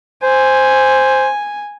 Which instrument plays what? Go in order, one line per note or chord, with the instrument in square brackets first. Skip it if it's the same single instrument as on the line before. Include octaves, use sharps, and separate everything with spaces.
[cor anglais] C5 [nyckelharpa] G#5